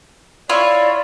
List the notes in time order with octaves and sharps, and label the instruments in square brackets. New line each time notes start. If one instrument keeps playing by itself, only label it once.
[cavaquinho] E4 F4 C#5 [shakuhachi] D5